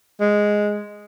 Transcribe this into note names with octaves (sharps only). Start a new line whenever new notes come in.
G#3